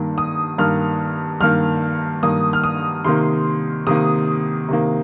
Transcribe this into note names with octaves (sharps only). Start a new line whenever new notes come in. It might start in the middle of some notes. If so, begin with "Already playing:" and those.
Already playing: G2 D#3 A#3
D#6
G2 D#3 A#3 F6
G2 D#3 A#3 F6
G2 D#3 A#3 D#6
F6
D#6
C3 D#3 A#3 C6
C3 D#3 A#3 D#6
C3 D#3 A#3